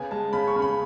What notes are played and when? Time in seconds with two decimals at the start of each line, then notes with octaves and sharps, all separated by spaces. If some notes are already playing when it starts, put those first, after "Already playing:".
Already playing: C#3 B3 G#5
0.11 G#3 A5
0.33 C#3 B5
0.47 C#6
0.56 C#3
0.62 B5